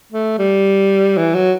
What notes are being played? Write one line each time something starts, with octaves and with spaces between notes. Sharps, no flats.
A3
G3
E3
F#3